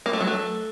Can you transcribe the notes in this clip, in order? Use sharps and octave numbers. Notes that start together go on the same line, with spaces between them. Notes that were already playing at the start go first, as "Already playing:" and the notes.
A#3
A3
F#3
A3